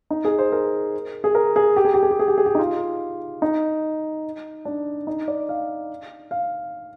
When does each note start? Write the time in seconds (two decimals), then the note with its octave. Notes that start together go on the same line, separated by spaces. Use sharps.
0.10 D#4
0.25 G#4
0.39 C5
0.52 A#4
1.24 G#4
1.35 A#4
1.56 G#4
1.76 G4
1.85 G#4
1.94 G4
2.03 G#4
2.11 G4
2.19 G#4
2.28 G4
2.38 G#4
2.46 G4
2.55 D#4
2.59 F4
3.42 D#4
4.65 D4
5.07 D#4
5.28 D5
5.49 F5
6.31 F5